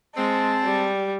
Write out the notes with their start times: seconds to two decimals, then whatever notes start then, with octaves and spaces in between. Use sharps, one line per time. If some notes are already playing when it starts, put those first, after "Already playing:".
0.16 G#3 C4 A5
0.64 G3